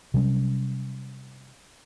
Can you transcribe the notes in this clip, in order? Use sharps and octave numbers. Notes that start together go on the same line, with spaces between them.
C3 F#3 G3 C#4